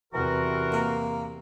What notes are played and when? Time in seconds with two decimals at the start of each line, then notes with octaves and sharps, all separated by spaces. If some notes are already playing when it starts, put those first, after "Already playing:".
0.14 E2 C3 E3 F#4 A#4
0.73 A#3